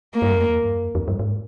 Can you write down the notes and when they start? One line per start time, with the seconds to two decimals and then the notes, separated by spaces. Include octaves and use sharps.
0.14 A#3
0.22 G2
0.31 F#2
0.40 F2
0.49 E2
0.63 G2
0.74 F#2
0.85 F2
0.95 F2
1.08 G2
1.19 G#2